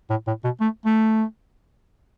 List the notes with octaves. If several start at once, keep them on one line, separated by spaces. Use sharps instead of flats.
A2
A2
B2
A3
A3